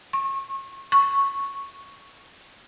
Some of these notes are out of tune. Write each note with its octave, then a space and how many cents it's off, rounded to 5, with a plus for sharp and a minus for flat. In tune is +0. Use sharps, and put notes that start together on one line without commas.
C#6 -30
C#6 -5